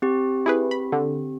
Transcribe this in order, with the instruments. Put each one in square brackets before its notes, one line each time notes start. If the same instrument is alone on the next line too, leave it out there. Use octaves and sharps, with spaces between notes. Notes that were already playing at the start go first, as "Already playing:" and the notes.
[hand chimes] C4 G4
[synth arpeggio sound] E4 G#4 B4
B5
D3